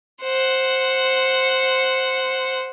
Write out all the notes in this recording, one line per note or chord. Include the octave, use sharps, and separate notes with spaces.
C5 F#5